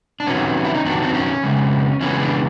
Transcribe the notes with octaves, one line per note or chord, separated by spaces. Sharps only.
D4
F2 C3 D#3 F#3 B3 C#4
E4
D#4
F2 C3 D#3 F#3 B3 D4
C4
C#4
F2 C#3 G#3 B3
F2 C#3 E3 G#3 B3 C#4
D4